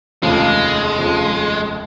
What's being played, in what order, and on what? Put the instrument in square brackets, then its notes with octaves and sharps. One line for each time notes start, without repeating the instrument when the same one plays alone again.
[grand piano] F1 D#2 C#3 F3 [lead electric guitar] G#3
[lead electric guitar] A#3
G#3
[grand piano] F1 D#2 C#3 F3